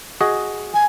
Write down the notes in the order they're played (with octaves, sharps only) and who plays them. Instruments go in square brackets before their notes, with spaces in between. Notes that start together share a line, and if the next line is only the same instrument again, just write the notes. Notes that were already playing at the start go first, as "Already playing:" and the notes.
[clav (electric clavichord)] F#4 G#4 D#5
[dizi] G#5